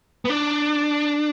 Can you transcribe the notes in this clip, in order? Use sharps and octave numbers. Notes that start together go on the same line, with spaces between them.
B3
D4